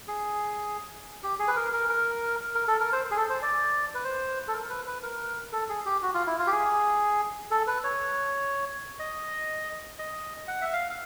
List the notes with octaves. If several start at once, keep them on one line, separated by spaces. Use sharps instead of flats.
G#4
G4
G#4
B4
A#4
A#4
A#4
A#4
A4
A#4
C5
G#4
A4
C5
D5
B4
C5
A4
A#4
B4
B4
A#4
A4
G#4
G4
F#4
F4
E4
F4
G4
G#4
A4
B4
C#5
D#5
D#5
F#5
E5
F5